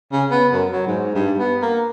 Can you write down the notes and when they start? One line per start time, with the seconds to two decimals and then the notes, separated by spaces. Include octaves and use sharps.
0.12 C#3
0.31 B3
0.53 F#2
0.72 F#3
0.87 G#2
1.15 G2
1.39 B3
1.62 A#3